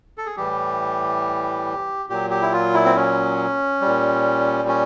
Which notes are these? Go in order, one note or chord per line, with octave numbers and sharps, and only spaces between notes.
A4
G#4
A2 E3 G3 G4
A#2 F#3 G4
G4
E4
F4
E4
C4
C#4
A#2 G3
C#4